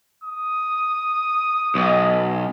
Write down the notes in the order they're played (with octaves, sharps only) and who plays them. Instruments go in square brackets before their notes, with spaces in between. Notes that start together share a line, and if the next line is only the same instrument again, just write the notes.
[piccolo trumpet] D#6
[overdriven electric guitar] B1